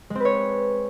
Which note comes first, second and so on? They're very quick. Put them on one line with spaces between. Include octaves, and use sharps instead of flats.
G#3 C4 B4 C#5